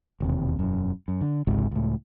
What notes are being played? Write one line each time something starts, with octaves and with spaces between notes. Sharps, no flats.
E1 D#2 C3
E1 F#2
F#2
D3
G#1 C#2 G#2 C3
C#2 A2